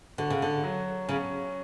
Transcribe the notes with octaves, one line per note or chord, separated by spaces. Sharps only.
D3 F#4
C#3
D3
F#3
C#3 C#4